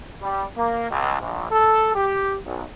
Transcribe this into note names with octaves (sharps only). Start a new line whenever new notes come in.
G3
A#3
C#2
A#1
A4
G4
B1